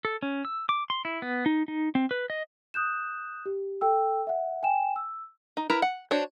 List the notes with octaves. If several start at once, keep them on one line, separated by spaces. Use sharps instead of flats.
A4
C#4
E6
D6
C6
E4
B3
D#4
D#4
C4
B4
D#5
D#6 F#6 G6 E7
G4
A4 G5 E6
E5 F#5
G5 G#5 E7
E6
D#4
E4 A#4 B4 A#5
F#5
D4 F#4 C5 C#5